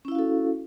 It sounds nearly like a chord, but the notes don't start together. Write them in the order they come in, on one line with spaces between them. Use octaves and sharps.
C#4 E4 F5 F#4 A4